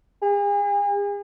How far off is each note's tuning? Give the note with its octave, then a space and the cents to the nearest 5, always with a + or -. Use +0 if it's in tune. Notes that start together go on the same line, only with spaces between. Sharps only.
G#4 -40